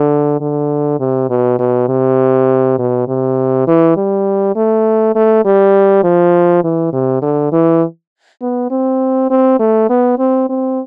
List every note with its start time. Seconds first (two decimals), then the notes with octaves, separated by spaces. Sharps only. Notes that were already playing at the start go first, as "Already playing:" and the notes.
Already playing: D3
0.40 D3
1.00 C3
1.29 B2
1.59 B2
1.88 C3
2.78 B2
3.08 C3
3.67 E3
3.96 G3
4.55 A3
5.15 A3
5.45 G3
6.03 F3
6.64 E3
6.93 C3
7.22 D3
7.52 E3
8.42 B3
8.70 C4
9.30 C4
9.59 A3
9.89 B3
10.18 C4
10.49 C4